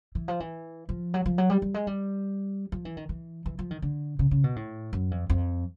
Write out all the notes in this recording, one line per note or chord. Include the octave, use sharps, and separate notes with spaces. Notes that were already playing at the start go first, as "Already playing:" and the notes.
E3
F3
E3
F3
F#3
F3
F#3
G3
G3
G#3
G3
F3
E3
D#3
E3
E3
F3
D#3
D3
C#3
C#3
B2
A2
F#2
F2
F2